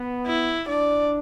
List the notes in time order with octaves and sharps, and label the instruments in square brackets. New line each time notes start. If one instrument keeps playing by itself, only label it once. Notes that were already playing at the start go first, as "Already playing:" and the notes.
Already playing: [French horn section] B3
[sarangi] E4
[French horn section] D4 [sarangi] D5